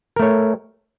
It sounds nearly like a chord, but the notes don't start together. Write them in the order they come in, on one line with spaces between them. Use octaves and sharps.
A#4 A3 C#5